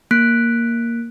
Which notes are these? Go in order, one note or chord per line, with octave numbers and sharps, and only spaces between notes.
A#3 F#6 B6 D7